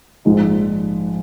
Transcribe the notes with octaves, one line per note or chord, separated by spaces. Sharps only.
A#1 G#2 F3 G#3 D#4